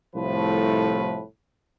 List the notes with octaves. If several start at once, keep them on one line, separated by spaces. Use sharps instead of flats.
C2 A2 F3 A3 B4